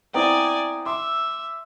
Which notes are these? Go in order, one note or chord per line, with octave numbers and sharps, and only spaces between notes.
B3 C4 E4 D5 G5 G#5 A#5 D#6
E5 C6 D6 E6